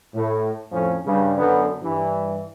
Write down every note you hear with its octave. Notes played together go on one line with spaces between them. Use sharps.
A2
F2 A2 F3 C#4
G2 C#3
F#2 D3 B3
G2 E3